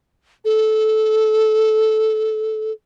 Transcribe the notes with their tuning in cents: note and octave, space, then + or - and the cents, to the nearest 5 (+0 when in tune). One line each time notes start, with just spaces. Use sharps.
A4 -15